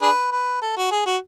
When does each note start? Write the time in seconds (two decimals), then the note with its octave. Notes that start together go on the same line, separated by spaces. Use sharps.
0.02 D4 G#4 B4
0.32 B4
0.62 A4
0.77 F#4
0.91 G#4
1.06 F#4